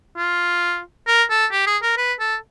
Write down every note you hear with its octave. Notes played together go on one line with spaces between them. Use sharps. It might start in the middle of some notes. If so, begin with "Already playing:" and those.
F4
A#4
A4
G4
G#4
A#4
B4
A4